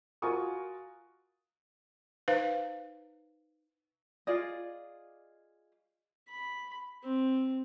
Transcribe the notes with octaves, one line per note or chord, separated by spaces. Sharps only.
F4 F#4 A#4 G#5 C#6 D#6
D#4 B4 C5 F5
F4 G#4 D5 D#5
B5
C4